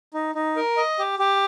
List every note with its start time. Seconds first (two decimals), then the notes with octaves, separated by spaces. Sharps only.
0.14 D#4
0.35 D#4
0.56 A#4
0.77 D#5
0.99 G4
1.19 G4